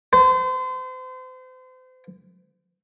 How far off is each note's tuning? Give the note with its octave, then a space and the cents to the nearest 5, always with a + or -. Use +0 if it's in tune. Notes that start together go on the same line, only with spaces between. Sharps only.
C5 -35